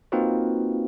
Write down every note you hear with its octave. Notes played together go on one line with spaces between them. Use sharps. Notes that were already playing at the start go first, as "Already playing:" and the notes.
A#3 C4 D#4 F4 F#4 B4